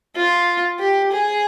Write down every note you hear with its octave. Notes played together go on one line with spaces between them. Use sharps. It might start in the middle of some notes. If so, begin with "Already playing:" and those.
F4
G4
G#4